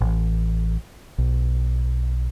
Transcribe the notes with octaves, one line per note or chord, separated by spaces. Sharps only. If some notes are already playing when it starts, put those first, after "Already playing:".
A1
B1